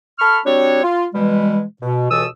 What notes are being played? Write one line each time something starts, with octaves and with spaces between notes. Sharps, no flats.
A4 B5 C#6 F6
G3 C4 D4 F#4 C#5
F4
B2 E3 G3 G#3
B2
C#2 B2 E3 A4 D#6 E6